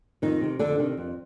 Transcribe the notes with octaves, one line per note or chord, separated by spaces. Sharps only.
F2 D#3 D#4
C3 D#3
F2 D3 D4
C3 D#3
F2